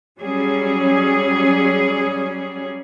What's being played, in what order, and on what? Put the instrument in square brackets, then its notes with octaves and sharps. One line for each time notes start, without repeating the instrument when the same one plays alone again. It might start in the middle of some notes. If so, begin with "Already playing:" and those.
[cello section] F#3 G3 C#4 G#4